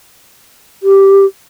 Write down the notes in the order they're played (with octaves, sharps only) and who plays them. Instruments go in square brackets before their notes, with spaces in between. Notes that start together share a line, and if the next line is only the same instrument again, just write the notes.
[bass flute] G4